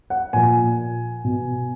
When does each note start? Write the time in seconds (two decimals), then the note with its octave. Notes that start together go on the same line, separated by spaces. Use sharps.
0.10 F#5
0.33 A#2 F3 G#5
1.24 B2